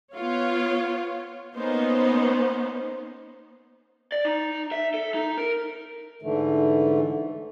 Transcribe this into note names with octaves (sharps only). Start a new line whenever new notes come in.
B3 F4 C#5
A#3 B3 C#4 D#4 C5
D5
D#4
E5
A4
D#4
A#4
G#2 D3 E3 A3